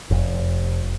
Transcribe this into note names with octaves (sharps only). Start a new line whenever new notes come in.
F1